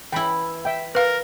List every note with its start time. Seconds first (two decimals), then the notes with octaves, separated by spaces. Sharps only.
0.12 E3 E4 G5 B5
0.65 E5 G5
0.95 A#4 B4 F5